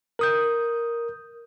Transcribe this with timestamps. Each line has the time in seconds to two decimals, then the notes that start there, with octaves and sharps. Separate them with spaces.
0.19 A#4 D#6 G6